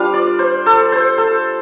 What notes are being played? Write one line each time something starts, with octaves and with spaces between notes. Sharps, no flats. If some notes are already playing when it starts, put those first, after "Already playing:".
Already playing: G3 D4 F4 F5
D5
C5
A4
C5
A4